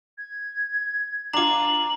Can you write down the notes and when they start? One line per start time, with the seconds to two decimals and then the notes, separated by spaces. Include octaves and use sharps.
0.18 G#6
1.33 D4 F4 A#5 D6 F#7